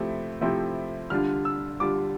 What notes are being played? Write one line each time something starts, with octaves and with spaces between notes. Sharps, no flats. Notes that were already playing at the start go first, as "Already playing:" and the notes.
Already playing: C3 F3 A3 C4 E4
C3 F3 A3 C4 E4
D3 G3 D4 F4 F6
E6
D3 G3 D4 F4 D6